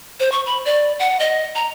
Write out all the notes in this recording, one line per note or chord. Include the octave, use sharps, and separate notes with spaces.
C5
C#6
B5
D5
F#5
D#5
A#5